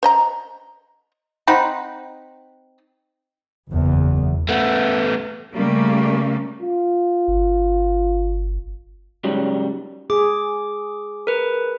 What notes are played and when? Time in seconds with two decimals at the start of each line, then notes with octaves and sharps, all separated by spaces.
0.03 C5 D#5 A#5
1.47 C4 D#4 F#5 B5
3.71 F#1 E2
4.49 A3 B3
5.53 C#3 G3 A3 A#3
6.62 F4
7.28 G1
9.24 G#2 C#3 F#3 G3
10.10 G#4 D6
11.27 A#4 B4